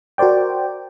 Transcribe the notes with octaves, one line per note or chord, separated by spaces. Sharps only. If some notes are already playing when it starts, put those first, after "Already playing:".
F#4 A#4 C5 D5 G5